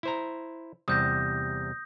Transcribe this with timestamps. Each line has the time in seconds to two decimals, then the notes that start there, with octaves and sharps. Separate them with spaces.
0.03 E4 C5 A#5
0.88 E2 C3 G3 D#6 G6 A#6